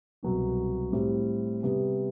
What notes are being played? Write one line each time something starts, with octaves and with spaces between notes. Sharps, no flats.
C2 B2 F#3 B3 F#4
A2 G3 C4
C3 G3 B3